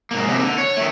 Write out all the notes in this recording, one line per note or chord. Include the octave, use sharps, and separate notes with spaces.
G#2 A#3
D#2 C3
D3
C#5
D#3 A3